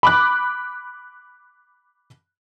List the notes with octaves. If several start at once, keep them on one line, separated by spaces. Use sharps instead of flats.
B5 D6 F#6